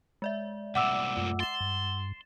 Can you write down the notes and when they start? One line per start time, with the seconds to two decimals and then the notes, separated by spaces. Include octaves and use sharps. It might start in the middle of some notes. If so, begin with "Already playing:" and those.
0.22 G#3 D5 E5
0.75 C2 A#2 F#5 D6 E6
1.17 F#2 A3 F4
1.40 C6 A6 E7
1.60 G2